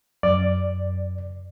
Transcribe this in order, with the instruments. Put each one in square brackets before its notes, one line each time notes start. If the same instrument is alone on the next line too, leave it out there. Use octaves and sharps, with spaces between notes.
[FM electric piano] F#2 [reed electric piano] D5